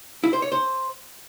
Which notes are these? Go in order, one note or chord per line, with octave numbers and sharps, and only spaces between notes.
E4
C5
C#5
C5